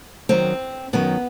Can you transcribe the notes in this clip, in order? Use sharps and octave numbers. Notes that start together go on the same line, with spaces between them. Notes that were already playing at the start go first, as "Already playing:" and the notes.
F#2 D#3 F#3 C4
F#2 D#3 F#3 B3